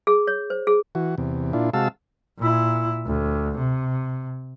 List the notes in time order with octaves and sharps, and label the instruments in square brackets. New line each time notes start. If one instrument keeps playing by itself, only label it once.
[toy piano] G#4
C#5
C5
G#4
[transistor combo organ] E3 F#4
E2 C3
A#2 D4 E4 F4
C3 G#3 F#4 F5 A5 E6
[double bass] A#2 E4
D2
C3